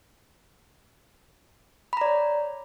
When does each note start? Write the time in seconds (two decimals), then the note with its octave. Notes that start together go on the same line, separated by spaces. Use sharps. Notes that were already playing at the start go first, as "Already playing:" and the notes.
1.93 B5
1.97 A#5
2.01 D5
2.06 C#5